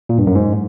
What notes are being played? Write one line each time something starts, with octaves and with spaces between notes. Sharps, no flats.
A#2
G2
F#2
G#2